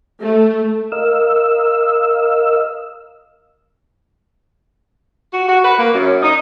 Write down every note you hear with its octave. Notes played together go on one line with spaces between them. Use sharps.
A3
A#4 D#5 F5 E6
F#4
F#4
B4
A#3
F#2
D#4